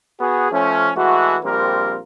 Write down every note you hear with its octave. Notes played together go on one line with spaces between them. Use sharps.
B3 F#4 G#4
F3 A3 C#4
E3 G#3 A3 F#4
A#1 G3 C4 F4 A#4